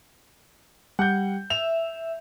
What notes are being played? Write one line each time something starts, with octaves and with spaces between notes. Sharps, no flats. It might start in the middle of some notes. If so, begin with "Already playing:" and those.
G3 F#5 G6
E5 F7